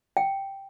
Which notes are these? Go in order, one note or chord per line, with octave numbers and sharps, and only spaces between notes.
G5